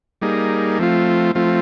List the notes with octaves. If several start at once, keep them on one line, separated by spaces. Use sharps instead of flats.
G3 A#3 D#4 G#4
F3 A3 C4 F4
F3 A3 C4 F4